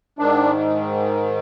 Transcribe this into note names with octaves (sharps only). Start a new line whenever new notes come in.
G#2 D#3 D4